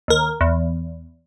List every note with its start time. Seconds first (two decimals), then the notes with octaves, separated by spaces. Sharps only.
0.08 D#2 A#4
0.41 E2